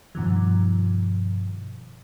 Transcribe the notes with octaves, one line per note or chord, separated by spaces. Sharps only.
G2 B2 D#3 F3